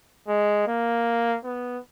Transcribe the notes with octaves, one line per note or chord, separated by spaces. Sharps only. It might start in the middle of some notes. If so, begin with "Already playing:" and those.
G#3
A#3
B3